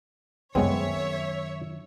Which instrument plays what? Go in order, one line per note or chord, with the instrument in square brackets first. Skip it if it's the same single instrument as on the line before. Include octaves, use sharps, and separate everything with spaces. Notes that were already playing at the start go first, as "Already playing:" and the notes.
[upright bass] F#2 D#3 [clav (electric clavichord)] G#3 B3 C4 [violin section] C#5 E5